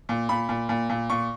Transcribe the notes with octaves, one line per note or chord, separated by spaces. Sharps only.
A#2
A#2 B5
A#2
A#2
A#2
A#2 C#6